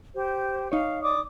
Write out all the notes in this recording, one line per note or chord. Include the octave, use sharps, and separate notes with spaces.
G4 C5
D#4 C#5 F5
D5 D6 D#6